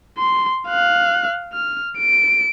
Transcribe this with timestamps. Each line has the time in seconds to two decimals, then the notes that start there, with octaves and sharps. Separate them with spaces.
0.18 C6
0.68 F5 F#6
1.53 F6
1.98 D7